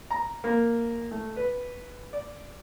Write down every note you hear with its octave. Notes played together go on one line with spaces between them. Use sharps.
A#5
A#3
A3
B4
D5